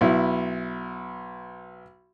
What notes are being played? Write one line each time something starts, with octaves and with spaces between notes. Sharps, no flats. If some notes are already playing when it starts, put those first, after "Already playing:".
B1 E4